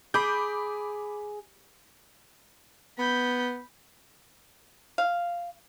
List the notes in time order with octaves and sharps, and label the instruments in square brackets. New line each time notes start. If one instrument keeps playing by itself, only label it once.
[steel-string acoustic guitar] G#4 [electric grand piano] B5 D6 G6
[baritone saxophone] B3 [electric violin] B5 G6
[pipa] F5